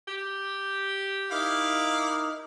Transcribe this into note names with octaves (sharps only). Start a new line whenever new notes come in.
G4
D#4 E4 A#4 F5 D6